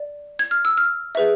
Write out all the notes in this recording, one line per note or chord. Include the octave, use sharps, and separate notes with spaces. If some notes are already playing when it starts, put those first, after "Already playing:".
Already playing: D5
G#6
F6
E6
F6
G#4 B4 E5